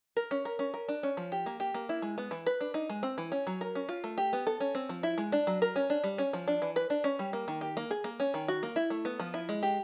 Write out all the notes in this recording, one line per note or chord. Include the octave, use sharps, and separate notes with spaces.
A#4
C#4
A#4
C#4
A#4
D4
C#4
F3
G4
A#3
G4
A#3
E4
G#3
B3
E3
B4
D4
D#4
G#3
C4
E3
C#4
F#3
A#4
C#4
F4
A3
G4
B3
A4
C#4
C4
F3
E4
G#3
D4
F#3
A#4
C#4
D4
G3
C#4
F3
D4
E3
B4
D4
C#4
G3
A#3
D#3
G4
A#3
G#4
A#3
C#4
D#3
F#4
A#3
E4
A3
B3
F3
E4
G#3
G4